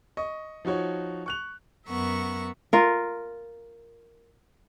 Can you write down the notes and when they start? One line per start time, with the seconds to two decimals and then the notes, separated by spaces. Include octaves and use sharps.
0.17 D#5 C#6
0.65 F3 D#4 F#4 C#5
1.26 C#6 F#6 F7
1.88 F#2 B3 A#4 E5 F#5 C#6
2.73 F4 A#4